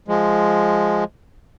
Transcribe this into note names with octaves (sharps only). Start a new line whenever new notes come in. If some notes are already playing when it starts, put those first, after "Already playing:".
F3 G#3